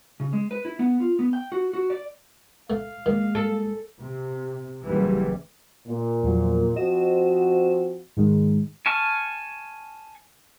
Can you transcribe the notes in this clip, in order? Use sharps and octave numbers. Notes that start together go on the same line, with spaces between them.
C#3
G#3
B4
E4
B3
F4
B3
G5
F#4
F#4
D5
A3 F5
D#3 G#3 A#3
A4
C3
F#1 E3 G3
A#2
E2 F3 F#3
F3 C4 F#4 D#5 E7
G#2 D#3 G#3
G#5 A5 C#6 F6